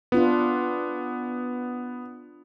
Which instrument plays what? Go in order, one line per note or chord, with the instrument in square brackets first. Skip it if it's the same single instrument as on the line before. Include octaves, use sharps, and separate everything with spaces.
[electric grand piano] B3 [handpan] D4 F4 B4